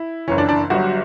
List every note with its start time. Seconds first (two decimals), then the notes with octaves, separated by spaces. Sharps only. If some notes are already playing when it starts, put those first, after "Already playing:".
Already playing: E4
0.27 F#1 F#2 E3 C#4
0.38 D4
0.49 D4
0.70 G1 G2 F#3 F#4